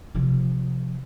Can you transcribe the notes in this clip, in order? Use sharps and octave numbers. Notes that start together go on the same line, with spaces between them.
C3 F3